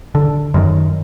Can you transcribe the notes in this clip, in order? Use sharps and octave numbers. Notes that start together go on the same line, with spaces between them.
D3
F#2 D#3